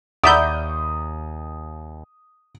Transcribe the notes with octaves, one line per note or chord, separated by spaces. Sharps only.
D#2 D5 E5 F#5 A#5 B5 D#6 G6